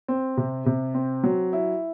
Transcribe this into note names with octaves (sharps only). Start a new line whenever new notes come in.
C4
C3
C3
C4
F#3
E4